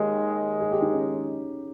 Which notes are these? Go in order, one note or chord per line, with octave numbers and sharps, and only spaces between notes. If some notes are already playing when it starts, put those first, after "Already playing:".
Already playing: D#2 D#3 G#3 G4
G#4
G4
D#4
C#4